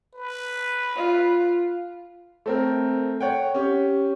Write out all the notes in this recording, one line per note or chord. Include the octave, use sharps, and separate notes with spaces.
B4
F4
A3 C4 A#4
C#5 F#5 G5
C#4 G4